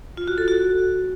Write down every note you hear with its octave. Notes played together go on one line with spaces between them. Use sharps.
F4
F#4
A4
F#4